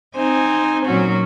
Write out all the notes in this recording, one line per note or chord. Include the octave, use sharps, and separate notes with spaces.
C4 D#4 C5 G#5
A#2 F#3 C#4 F#4